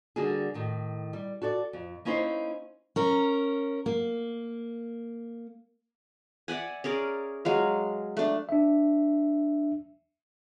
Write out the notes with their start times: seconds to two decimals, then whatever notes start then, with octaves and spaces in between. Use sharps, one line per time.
0.16 D3 G3 A#3 F#4 G#4
0.54 A2 D#3
1.13 G3
1.42 F#4 A4 D5
1.73 F2
2.05 A#3 C#4 D#4 E4 B4 C5
2.96 C#4 A#4
3.86 A#3
6.48 D5 E5 F#5 G#5
6.84 C#4 G#4 A#4 D5
7.45 F#3 G#3 F5
8.17 A3 D4
8.49 D4 E5